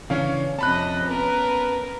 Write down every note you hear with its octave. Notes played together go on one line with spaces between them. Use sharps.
C#3 E3 C#4 D4 C#5 F5
F2 C3 C#4 D#5 A5 B5 F#6
B3 A#4 B4